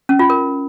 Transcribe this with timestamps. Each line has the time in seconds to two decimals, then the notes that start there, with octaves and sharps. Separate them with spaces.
0.09 C#4
0.19 F4
0.30 A#4